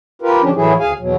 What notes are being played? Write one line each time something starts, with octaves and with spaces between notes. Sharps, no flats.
F4 G4 A#4 B4
D3 F3 C#4 D4 G4
A2 E3 F#3 A3 E4 G#4
D2 G#4 F5 G#5
E2 B2 F#3